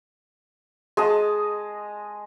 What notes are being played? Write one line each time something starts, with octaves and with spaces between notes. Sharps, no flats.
G#3 D#5 A5